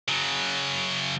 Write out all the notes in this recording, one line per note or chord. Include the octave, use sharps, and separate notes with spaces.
C#3 F#3